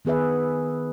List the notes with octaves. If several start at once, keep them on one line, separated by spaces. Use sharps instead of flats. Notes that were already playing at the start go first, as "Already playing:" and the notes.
D#3 B3 G#4 B4 E5